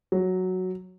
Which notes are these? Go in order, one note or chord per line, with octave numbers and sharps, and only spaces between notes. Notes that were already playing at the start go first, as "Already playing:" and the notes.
F#3